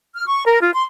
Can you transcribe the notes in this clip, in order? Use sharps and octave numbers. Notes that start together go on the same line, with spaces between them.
F6
C#6
A#4
F4
C6